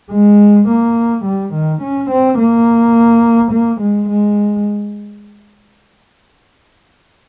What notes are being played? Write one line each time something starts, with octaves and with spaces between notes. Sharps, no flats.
G#3
A#3
G3
D#3
C#4
C4
A#3
A#3
G#3
G#3